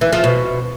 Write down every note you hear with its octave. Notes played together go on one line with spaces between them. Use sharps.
E3
F3
B2